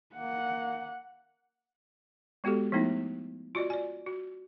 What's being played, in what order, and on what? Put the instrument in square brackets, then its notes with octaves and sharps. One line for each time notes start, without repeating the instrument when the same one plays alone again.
[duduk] A#3 [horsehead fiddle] F#5
[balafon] G#3 B3 F#4 G4 A4
F3 A3 B3 D#4 E4
F4 F#4 D5 D#5
D5 G#5
F#4